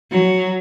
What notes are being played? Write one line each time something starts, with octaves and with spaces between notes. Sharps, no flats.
F#3